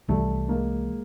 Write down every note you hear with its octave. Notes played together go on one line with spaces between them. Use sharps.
C2 C3 E3 G3 A3
G#3 A#3